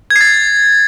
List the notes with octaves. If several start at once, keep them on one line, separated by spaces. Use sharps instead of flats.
G#6
C7
A6